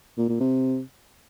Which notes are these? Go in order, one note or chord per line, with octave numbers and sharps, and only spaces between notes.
A#2
A#2
C3